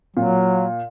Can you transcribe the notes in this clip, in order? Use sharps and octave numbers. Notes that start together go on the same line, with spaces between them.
A#2 F#3